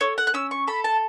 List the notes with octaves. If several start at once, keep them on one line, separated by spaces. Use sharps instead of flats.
A4 C#5
F#5
F#6
C#4 E6
C#6
A4 B5
A5